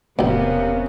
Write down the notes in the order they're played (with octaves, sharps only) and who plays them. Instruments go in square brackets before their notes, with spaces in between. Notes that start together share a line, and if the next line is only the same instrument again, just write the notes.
[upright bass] E1 [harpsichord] A1 D2 [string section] C3 B3 [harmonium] A#3 C#4